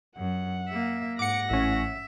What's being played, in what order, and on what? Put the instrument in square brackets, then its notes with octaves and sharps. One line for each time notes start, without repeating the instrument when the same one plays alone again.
[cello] F#2 [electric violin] F#5
[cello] A#3 E5
[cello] G#2 [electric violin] F#5 A#6 [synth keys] D6 C#7
[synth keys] A1 C#4 [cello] E5